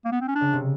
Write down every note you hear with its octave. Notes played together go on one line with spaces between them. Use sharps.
A#3
B3
C4
C#4
D4
C#3
C3